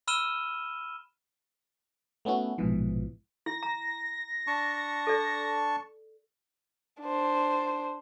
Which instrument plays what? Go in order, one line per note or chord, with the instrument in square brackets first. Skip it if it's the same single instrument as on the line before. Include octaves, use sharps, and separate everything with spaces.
[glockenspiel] B5 E6 F6 D#7 E7 G7
[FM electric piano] A3 B3 C#4 E4 F#4
A#1 G#2 B2 E3 F3
[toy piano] E4 [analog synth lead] A#6
[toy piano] A#5
[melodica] D4 A5 C#6
[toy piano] A4 D5
[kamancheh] D4 C5